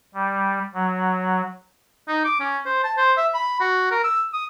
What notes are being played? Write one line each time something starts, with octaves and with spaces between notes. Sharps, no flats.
G3
F#3
D#4
D6
C#4
C5
A5
C5
E5
B5
F#4
A#4
E6
D#6